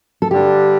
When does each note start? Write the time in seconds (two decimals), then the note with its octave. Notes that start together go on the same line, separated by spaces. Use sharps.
0.22 A4
0.31 G2 D3 G3 D4 G4